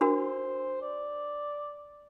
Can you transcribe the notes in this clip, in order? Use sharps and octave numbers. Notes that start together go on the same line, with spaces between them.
D4 F#4 A#4 C5
D5